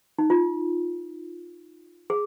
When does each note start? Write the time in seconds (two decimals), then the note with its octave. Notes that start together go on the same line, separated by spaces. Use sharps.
0.19 D#4
0.30 F4
2.10 G#4